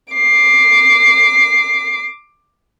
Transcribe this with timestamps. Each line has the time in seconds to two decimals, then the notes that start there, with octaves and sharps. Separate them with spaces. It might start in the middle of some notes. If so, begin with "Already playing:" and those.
0.13 D6 C7